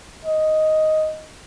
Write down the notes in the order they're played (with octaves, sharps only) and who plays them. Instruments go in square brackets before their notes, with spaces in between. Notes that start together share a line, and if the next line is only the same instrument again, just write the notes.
[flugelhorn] D#5